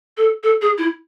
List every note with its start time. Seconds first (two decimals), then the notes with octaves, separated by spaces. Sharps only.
0.17 A4
0.43 A4
0.62 G#4
0.78 E4